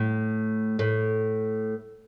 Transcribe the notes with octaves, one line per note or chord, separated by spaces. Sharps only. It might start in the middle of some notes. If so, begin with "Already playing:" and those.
Already playing: A2
A2